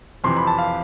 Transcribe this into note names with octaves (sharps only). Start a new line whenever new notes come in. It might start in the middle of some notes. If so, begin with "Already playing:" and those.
F2 C3 E3 C6
B5
A5
F5